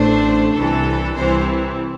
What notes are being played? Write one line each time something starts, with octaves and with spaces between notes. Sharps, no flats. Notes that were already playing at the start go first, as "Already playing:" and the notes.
Already playing: A1 A2 A3 D4 C5
C2 C3 E3 A4
C2 C3 E3 C4 E4 C5